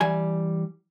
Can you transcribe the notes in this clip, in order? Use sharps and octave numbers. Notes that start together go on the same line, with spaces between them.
E3 G3 G#5